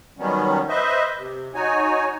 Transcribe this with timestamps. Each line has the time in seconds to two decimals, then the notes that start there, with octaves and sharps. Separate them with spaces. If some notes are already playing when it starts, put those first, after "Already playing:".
0.19 D#3 F#3 G3 B3 C#4
0.69 B4 C5 D#5 E5
1.18 C3
1.55 D#4 F#4 C#5 G#5